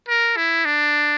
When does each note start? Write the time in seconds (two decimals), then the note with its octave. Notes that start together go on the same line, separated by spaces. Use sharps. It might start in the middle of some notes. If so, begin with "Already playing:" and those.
0.08 A#4
0.37 E4
0.65 D4